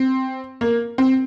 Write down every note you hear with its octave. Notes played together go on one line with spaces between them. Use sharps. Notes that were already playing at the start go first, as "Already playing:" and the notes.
Already playing: C4
A#3
C4